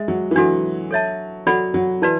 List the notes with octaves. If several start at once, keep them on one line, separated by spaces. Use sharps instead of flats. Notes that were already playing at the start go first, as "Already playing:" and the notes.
Already playing: G#3 E5
F#3
E3
F#3 D4 F#4 A4
A4 C#5 E5 A5
F#3 A4 D5 F#5 B5
F#3
E3 F#4 B4 D5 A5